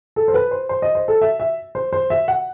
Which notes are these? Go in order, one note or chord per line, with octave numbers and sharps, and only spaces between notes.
A4
C5
B4
C5
C5
D#5
C5
A4
E5
E5
C5
C5
E5
F#5